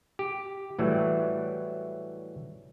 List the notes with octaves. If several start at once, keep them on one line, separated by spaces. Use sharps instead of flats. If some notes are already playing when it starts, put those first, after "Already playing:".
G4
A2 E3 F#3 G3 A3